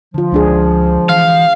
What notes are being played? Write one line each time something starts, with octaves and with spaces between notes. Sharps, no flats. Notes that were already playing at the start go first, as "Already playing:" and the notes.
D3 F3 F4
C#2 G#3 D4 G#4
E3 F5